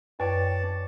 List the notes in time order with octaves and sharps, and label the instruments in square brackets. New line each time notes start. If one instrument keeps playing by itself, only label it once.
[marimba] F#2 [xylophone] B4 G5 [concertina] C#5 D5 A5